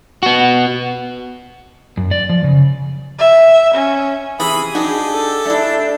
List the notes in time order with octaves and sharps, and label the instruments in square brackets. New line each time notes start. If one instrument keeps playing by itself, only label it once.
[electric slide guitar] B3 F#4
F#2
D5
F3
C#3
[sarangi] E5
C#4
[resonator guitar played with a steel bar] C3 E3 [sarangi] G#4 [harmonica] B5 D#6
[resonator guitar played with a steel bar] D4 D#4 F#4 [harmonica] G4
[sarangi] A4
[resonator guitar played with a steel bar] A3 E4 [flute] D4